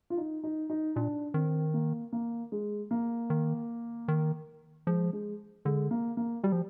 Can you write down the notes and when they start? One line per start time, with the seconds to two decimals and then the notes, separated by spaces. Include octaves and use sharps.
0.10 F4
0.17 D#4
0.43 D#4
0.70 D#4
0.96 A#2 D4
1.34 D#3 C4
1.74 A#3
2.13 A#3
2.52 G#3
2.91 A#3
3.30 D#3
4.08 D#3
4.87 F3 G#3
5.13 G#3
5.65 D3 G#3
5.91 A#3
6.17 A#3
6.43 G3 G4
6.52 F3